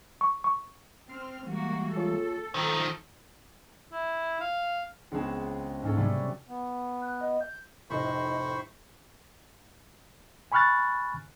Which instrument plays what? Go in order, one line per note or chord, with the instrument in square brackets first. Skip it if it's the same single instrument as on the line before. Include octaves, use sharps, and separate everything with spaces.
[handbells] C#6
C#6
[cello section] C4 [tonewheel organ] C6 F6
[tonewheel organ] E3 G3 G#3 [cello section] A#3 F#4
[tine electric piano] F4 G#4 C#5 [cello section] A4
[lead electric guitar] D#3 F3 [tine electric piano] C5 A#5 [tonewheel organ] G5
[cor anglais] E4
F5
[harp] C#2 B3 C4 G#4 E7
G#2 A#3 C#4 A4
C3 F#3 G3 A3 B3 C#4
[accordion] B3
[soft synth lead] F#6
D#5
G6
[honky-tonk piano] F1 A2 D#5 [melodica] C5 B5 C#6
[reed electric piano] G#5 B5 C#6 F6 F#6 A6